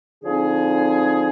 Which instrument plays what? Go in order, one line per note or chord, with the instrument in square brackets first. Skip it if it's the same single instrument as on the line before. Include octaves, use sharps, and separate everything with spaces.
[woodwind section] D3 F3 C4 D#4 G#4